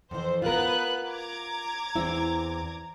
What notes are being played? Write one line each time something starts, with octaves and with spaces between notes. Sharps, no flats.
F2 E3 C5
B3 F4 A#4 B4 F#6
A#5 D6 G#6
E2 C4 E4